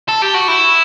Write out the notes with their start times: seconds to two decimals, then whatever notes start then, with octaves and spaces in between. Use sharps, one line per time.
0.09 A4
0.22 G4
0.35 F#4
0.48 E4